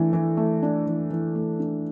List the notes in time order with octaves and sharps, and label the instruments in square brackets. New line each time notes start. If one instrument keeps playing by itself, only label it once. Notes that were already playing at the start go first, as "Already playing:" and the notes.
Already playing: [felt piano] E3 A3 D4
E3
A3
D4
E3
E3
A3
D4